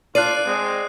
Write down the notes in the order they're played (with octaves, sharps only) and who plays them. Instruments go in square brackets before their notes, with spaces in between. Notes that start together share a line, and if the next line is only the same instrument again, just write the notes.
[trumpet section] D4 F4 [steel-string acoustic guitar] D5 [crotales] F#6 C7 D#7
[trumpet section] G#3 C4